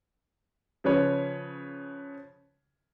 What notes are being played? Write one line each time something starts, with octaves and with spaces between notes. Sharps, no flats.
C#3 F3 C#4 B4 C#5